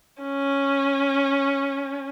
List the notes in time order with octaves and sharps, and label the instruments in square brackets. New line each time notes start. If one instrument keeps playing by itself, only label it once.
[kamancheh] C#4